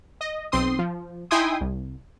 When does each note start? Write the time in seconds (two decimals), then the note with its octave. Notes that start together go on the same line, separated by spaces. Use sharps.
0.21 D#5
0.52 B1 C4 C6 D#6
0.79 F3
1.31 D#4 E4 G5 G#5 C6 D#6
1.61 C2